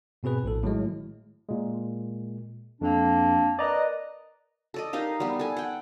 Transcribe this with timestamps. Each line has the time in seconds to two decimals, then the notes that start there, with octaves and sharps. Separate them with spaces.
0.23 G#2 B2 C4 G#4 B4
0.44 A#1 A2 A4
0.63 A2 D#3 F#3 G#3
1.49 A#2 G#3
2.81 F2 A#3 C4 D4
3.59 A#4 B4 D5 D#5 A#5
4.74 A4 D5 D#5
4.93 D#4 G4 A#4 F5
5.20 G3 B3
5.39 A4 G#5
5.57 F#5 G5